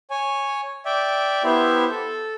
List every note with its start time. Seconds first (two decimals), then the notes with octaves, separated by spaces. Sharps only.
0.10 C#5 G#5
0.85 D5 E5 G5
1.44 B3 E4 G4 C5 E5
1.90 A4